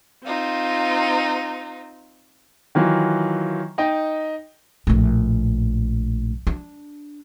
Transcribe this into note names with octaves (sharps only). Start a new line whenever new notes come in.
C4 D#4 F4
D#3 E3 F#3 F4
D#4 D#5 G5
A#1 A2
D4